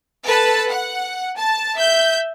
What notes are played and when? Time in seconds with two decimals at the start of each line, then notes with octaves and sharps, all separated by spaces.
0.24 A4 B4 A5
0.70 F#5
1.35 A5
1.76 E5 G6